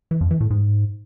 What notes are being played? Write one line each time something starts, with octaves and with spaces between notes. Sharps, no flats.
E3
F2
E3
A2
G#2